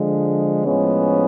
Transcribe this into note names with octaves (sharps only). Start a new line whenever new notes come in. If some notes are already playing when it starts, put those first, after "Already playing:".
Already playing: D3 F3 G#3
A2 F3 G#3 B3 C#4